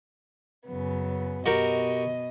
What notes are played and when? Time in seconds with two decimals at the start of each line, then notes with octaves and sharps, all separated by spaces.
0.67 F#2 C#3 B3
1.46 B2 F#4 G4 A#4 D#5